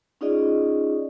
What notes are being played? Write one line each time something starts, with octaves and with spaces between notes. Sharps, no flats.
C#4 D#4 F4 G#4 D5 D#5